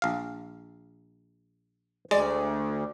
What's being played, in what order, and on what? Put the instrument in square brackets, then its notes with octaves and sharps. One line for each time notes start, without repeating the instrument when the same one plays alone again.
[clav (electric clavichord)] A#1 F5
[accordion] D2 [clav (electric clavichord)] G#3 [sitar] D5